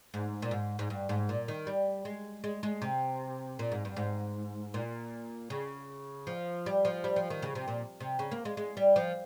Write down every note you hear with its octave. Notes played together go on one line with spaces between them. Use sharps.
G#2
A#2
G#2
G#2
G2
G#2
A#2
D#3
G3
G#3
G#3
G#3
C3
A#2
G#2
G2
G#2
A#2
C#3
F3
G3
F3
G3
F3
D#3
C#3
C3
A#2
C3
C#3
A#3
G#3
G#3
G3
F3